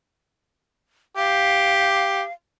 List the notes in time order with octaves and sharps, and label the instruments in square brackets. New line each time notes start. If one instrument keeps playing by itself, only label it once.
[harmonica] G4 [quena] F5